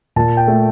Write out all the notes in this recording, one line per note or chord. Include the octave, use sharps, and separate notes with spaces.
A#2 A5
G5
A3